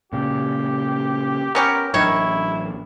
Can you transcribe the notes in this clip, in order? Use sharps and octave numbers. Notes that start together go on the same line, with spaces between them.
A#2 C#3 G4
B3 C#4 G4 A#4
A1 D#3 F#3 D4 E4 C#5